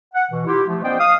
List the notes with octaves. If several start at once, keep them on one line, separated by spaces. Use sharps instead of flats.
F#5
B2 E3
E4 F4 G4
F3 A3
B3 C#4 C5 D5 D#5 G5
F5 D#6